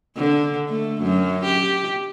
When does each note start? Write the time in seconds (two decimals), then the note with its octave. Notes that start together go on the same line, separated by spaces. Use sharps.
0.16 D3
0.69 A3
1.01 F#2
1.45 G4